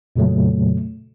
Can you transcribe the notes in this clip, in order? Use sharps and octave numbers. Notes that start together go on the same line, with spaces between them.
F2 A#2 C#3 F#3 A3